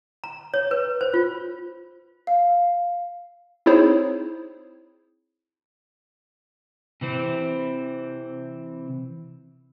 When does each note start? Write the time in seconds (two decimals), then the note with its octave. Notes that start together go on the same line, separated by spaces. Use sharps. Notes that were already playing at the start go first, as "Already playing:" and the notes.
0.24 A#5
0.54 C#5
0.71 B4
1.01 C5
1.14 F4
2.27 F5
3.66 C4 D#4 E4 G#4 C5 C#5
7.01 C3 E3 C4